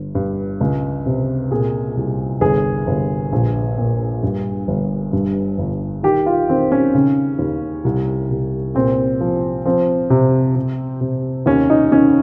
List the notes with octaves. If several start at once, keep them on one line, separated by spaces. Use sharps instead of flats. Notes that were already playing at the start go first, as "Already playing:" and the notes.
Already playing: G1
G2
C#2
C3
A#2 G#4
C2
G1 G#4
G1
A#1
A#2
G2
G1
G2
G1
D#3 G4
F4
D#3 C4
C#4
C#3
D#2
C2
C2
A#2 C4
F3
F3 C4
C3
C3
C3
D#2 C#4
D#4
D#3 C#4